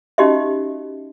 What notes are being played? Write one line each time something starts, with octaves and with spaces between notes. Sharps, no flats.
C#4 D#4 F#4 G4 D#5 E5